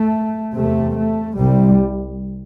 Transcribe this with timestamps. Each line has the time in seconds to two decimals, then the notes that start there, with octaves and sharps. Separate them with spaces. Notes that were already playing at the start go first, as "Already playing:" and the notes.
Already playing: A3
0.55 E2 C3 A3
0.96 A3
1.36 C2 C3 G3